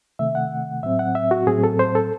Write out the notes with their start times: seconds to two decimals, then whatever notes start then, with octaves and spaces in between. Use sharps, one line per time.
0.19 C3 D#3 A3 E5
0.35 F#5
0.83 A2 F#3 C4 E5
0.99 F#5
1.15 E5
1.31 F#4
1.47 A2 F#3 C4 G#4
1.64 A4
1.79 C5
1.95 A4